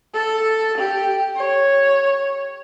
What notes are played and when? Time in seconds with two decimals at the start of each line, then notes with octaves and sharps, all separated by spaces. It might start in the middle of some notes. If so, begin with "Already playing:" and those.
0.14 A4
0.78 G4
1.36 C#5